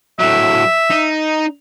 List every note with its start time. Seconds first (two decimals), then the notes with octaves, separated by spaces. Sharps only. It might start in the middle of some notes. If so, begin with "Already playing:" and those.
0.19 A2 F#3 E5
0.90 D#4